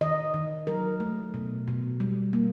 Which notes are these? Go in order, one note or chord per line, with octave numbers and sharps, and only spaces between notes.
D#3 D#5
D#3
F#3 A#4
A3
B2
B2
G3
A#3